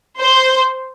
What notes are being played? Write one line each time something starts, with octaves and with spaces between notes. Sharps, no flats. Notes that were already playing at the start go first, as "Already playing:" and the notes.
C5